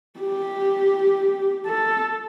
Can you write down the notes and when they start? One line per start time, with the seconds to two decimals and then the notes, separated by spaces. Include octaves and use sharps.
0.20 G4
1.66 A4